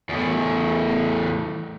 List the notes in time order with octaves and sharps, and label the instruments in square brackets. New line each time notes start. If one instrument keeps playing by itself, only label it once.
[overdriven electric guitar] E2 A2